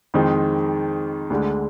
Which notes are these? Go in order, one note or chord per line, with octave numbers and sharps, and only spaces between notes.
F2 D#3 G#3 C4 D#4
D2 D3 G#3